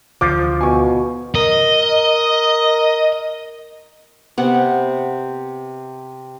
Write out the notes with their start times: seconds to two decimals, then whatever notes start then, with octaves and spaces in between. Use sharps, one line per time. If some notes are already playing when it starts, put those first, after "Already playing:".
0.21 D2 D3 E3 F3 D6
0.61 B2 G#5 C#6
1.35 A#4 D#5
4.38 C3 B3 F#5